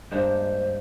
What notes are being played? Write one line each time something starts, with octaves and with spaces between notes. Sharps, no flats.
G2 G#3 A#3 D4 C5